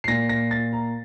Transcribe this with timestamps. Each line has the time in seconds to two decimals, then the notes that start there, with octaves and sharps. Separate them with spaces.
0.04 C7
0.08 A#2 A#6
0.29 A#6
0.51 A6
0.73 A#5